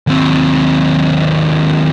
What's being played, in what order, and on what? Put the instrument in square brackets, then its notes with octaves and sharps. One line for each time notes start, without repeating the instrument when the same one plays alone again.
[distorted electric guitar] D#2 C4